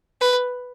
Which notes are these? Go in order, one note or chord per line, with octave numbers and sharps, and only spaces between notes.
B4